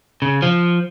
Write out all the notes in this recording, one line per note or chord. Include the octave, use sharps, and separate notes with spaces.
C#3
F3